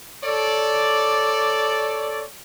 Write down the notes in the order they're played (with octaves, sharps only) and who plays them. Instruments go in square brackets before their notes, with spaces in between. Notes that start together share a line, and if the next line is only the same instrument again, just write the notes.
[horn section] A4 C#5 D5